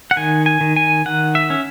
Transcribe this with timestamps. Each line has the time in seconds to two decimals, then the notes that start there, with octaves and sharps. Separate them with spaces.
0.11 F#5
0.17 D#3 G#5
0.46 G#5
0.61 D#3
0.76 G#5
1.05 D#3 F#5
1.35 E5
1.50 C#4